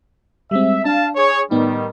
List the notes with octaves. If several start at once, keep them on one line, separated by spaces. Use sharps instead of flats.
G3 G#3 C4 E5
D4 F5 A5
G#4 C#5
A2 D#3 G3 B3 D#4